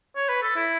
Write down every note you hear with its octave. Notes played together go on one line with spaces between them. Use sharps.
C#5
B4
A4
E4